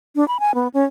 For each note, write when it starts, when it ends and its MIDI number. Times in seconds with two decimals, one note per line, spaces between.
0.16 0.27 62
0.28 0.37 83
0.40 0.55 80
0.55 0.68 59
0.74 0.84 61